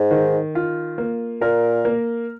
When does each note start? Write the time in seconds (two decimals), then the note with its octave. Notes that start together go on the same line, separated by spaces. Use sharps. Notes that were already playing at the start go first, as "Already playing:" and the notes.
Already playing: G#2
0.11 D#3
0.55 F4
0.98 A#3
1.41 A#2 A#4
1.85 A#3